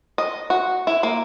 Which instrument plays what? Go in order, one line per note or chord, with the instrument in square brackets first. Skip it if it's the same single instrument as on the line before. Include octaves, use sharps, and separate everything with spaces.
[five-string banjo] D#5
F#4
E4
A#3